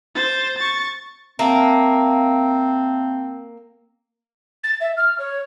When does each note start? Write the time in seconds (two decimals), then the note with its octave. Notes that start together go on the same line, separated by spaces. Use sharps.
0.15 C5 A6
0.57 C#6 A6
1.39 A#3 C4 E5 F5 A5
4.64 A6
4.81 E5
4.97 F6
5.19 C#5